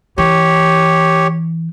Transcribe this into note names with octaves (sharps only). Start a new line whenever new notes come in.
E3 G4 C#5